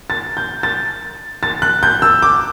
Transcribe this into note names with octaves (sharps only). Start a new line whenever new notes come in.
A6
G6
A6
A6
F#6
G6
E6
D6